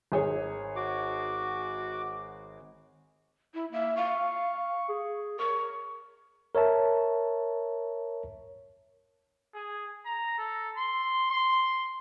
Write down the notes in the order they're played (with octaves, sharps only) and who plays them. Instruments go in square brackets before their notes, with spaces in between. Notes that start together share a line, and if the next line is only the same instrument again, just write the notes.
[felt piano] G#1 G#4 C#5
[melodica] F#4 D6
[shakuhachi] E4
[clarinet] A#3 [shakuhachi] E5
[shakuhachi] F5 [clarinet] C#6
[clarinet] G#4
[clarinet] A#4 [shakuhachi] C#6
[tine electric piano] A#4 C#5 E5 A5
[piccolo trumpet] G#4
A#5
A4
C6
C6